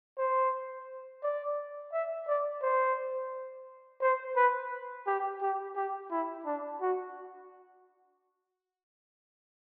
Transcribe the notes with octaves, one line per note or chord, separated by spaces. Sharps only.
C5
D5
E5
D5
C5
C5
B4
G4
G4
G4
E4
D4
F#4